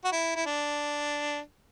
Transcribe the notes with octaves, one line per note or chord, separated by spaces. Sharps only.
F#4
E4
E4
D4